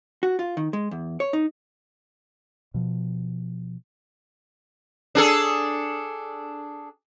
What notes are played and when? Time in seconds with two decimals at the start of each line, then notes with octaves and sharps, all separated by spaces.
0.23 F#4
0.39 F4
0.57 D#3
0.73 G#3
0.91 E2
1.20 C#5
1.33 D#4
2.74 B2 F3
5.15 D4 G#4 A4